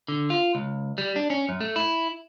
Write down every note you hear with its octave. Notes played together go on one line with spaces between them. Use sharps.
D3
F4
C#2
G3
D4
C#4
F#2
A3
E4